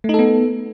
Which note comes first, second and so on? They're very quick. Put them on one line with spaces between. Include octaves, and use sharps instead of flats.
A3 D#4 A4 B3